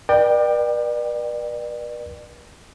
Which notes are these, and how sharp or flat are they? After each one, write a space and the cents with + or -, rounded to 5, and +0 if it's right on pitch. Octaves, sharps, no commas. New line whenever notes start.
B4 -45 D5 +30 G5 +0